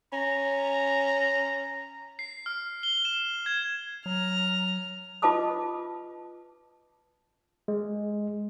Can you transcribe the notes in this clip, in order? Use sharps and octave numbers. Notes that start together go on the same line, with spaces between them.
C#4 A#5
C7
F6
G7
E7
G#6
F#3 A#5 F6
F4 B4 D#5 A5 D6 D#6
G#3